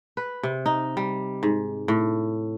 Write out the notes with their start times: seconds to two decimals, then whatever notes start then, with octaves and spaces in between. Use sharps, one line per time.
0.17 B4
0.43 C3
0.66 D#4
0.97 G3
1.43 G#2
1.88 A2